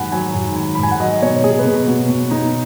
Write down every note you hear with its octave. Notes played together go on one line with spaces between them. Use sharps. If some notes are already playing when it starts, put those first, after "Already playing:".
Already playing: G#2 D#3 F#3 F#5 G#5 B5
F#3 G#5
G#2
D#3 G#5
G#2 B5
G#5
F#5
F#3 D#5
B2 C#5
B2 G#4
B4
B2 G#4
B2 F#4
B2
B2 D#4